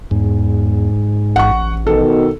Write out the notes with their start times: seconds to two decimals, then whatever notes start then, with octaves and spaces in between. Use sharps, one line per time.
0.11 E2 G#2
1.36 A1 F#5 C#6
1.87 B2 D#3 A4